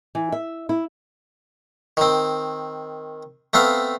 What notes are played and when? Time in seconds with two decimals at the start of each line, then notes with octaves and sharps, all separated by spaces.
0.15 E3
0.32 E5
0.69 E4
1.97 D#3 C4
3.53 A3 B3 C4 F5